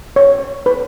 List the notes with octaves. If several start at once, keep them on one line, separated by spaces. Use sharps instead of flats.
C#5
B4